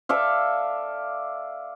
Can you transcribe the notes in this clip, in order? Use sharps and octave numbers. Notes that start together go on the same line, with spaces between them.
A4 D5 E5 F5